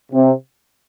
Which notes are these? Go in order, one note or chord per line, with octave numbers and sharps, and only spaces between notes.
C3 C4